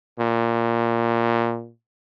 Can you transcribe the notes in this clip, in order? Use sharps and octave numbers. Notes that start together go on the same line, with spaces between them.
A#2